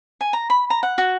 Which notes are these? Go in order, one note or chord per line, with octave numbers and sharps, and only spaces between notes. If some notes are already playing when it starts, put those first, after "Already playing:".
G#5
A#5
B5
A#5
F#5
F#4